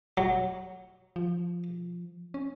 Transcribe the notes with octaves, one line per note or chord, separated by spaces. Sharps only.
F#3
F3
C#4